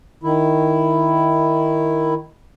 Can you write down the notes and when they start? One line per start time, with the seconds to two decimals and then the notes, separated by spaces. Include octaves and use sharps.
0.23 D#3 E4